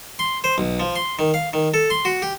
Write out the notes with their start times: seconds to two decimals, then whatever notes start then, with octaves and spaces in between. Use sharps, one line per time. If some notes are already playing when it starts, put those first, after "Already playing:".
0.19 C6
0.44 C5
0.58 B1
0.80 F3
0.96 C6
1.19 D#3
1.34 F5
1.53 D#3
1.74 A4
1.90 C6
2.05 F#4
2.22 G4